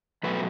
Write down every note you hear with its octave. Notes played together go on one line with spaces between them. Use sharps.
E2 B2 F#3 A3 B4